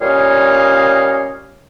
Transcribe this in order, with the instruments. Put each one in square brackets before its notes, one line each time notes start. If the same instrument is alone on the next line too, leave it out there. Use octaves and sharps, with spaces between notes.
[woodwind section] A#2 G3 C#4 C#5 D#5 F5